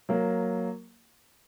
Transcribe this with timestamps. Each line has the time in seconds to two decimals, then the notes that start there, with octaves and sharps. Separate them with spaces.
0.09 F#3 A#3